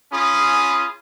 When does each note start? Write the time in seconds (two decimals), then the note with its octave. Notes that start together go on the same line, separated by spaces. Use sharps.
0.12 C#4 F4 G#4 B5 D#6